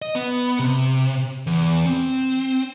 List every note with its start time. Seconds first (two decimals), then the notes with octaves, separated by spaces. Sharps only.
0.02 D#5
0.15 B3
0.59 C3
1.47 E2
1.86 C4